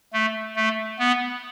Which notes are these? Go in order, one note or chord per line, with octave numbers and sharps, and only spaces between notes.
A3
A3
B3